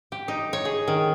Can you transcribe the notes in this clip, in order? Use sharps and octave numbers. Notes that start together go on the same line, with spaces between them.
G4
D#4
C#5
G#4
D#3